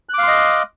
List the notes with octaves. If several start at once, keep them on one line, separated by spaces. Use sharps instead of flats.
D#5 F5 C6 D6 F#6